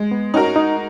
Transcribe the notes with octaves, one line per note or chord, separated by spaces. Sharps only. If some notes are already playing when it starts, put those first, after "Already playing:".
Already playing: G#3
B3
C#4 D#4 F#4 A#4
D#4